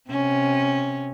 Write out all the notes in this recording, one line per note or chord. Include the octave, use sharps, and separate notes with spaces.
C3 C#4